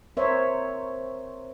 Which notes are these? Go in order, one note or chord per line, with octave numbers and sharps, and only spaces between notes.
C4 A#4 C5 C#5 E5